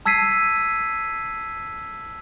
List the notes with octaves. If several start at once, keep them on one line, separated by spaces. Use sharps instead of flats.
A5 E6 G#6 B6 C7 D#7